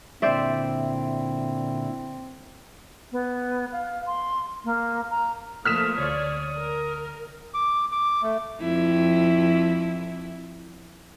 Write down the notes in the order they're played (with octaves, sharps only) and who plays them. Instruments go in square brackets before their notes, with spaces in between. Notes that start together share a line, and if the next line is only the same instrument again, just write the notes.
[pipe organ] A#2 D3 E4 [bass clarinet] C4 [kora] C5 D5 E5
[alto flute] B3
F5
C6
A#3
A#5
[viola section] F3 A3 A#3 [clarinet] D#6 [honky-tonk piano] F6 B6 E7
[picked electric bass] D2 [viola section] C#5 D5
[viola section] A#4
[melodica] D6
D6
A3
[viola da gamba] F2 E4